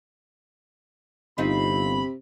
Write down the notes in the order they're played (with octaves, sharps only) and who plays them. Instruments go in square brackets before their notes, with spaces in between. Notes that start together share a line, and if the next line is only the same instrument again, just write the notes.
[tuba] G1 [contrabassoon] C3 [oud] C4 D#4 F4 [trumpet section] B5